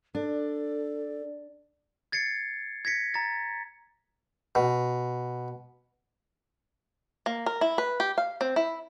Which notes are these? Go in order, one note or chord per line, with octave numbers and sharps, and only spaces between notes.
D4 A4
G#6 A6 C7 C#7
G#6 A#6 B6 C#7
A#5 A6
B2
A#3
A#4
E4
B4
G4
F5
C4
E4